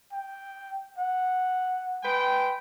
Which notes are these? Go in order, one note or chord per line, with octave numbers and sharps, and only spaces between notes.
G5
F#5
G#3 B4 G5